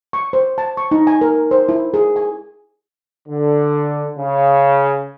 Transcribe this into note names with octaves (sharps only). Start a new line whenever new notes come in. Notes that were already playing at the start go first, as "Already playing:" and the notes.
C#6
C5
A5
C#6
D#4
G#5
A#4
C5
E4
G#4
G#5
D3
C#3